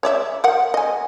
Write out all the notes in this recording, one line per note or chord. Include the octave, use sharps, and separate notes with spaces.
C#5 D5 E5
A#4 F#5
D#5 G#5